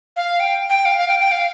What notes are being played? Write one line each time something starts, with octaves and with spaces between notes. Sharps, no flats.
F5
G5
G5
F5
F5
G5
G5
F5